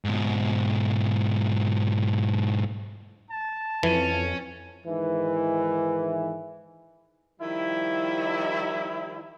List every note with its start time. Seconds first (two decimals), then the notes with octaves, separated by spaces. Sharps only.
0.05 G#2 B2
3.31 A5
3.83 F2 E3 C#4
4.85 G#2 D#3 E3
7.40 D#3 F3 G3 E4